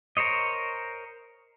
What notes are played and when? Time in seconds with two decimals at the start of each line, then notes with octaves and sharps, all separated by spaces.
0.17 A#4 C5 C#5 D#5